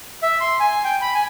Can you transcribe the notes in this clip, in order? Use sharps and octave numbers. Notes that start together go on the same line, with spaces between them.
E5
C6
G#5
G5
B5
G#5